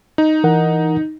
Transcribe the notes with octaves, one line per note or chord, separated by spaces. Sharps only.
D#4
E3 A#4 F#5